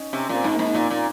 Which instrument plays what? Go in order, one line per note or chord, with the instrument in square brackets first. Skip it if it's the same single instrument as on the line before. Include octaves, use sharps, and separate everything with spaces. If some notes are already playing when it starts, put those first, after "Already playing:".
Already playing: [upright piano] C#4 D#4
[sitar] C3 [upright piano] C#4
[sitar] A#2 [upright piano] C4
[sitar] G#2
[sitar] G#2 [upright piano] A#3
[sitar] A#2
A#2